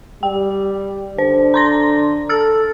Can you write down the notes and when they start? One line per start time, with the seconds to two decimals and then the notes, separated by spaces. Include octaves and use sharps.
0.23 G3 G5
1.18 D3 C5
1.54 A#5 C6 A#6
2.29 A4 E6 F6 A6